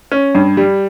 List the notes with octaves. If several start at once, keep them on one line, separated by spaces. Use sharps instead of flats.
C#4
G2
G3